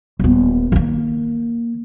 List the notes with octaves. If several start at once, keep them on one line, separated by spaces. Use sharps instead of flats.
D#1 B3
D#3 A#3